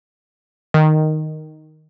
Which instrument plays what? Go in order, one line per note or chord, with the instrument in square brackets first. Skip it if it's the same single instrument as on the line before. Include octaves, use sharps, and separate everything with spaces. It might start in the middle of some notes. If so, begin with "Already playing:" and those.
[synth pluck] D#3